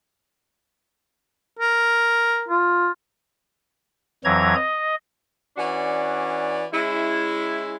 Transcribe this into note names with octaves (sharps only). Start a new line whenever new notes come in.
A#4
F4
F2 E3 F#3 A#5 G#6
D#5
E3 C#4 D4 F#4 D5
G#3 C#4 E4